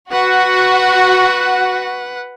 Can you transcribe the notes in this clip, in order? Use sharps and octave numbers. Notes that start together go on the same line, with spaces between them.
F#4 B4 F#5